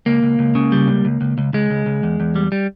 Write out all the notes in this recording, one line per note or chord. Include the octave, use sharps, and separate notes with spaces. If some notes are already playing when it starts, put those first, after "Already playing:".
C#2 A#3
C#2
C#2
C#3
G3
C#2
C#2
C#2
C#2
C#2 G#3
C#2
C#2
E2
E2
G3
G3